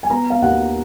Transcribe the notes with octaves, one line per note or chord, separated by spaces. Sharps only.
G#5
B3 A#5
F5
D#2 F#5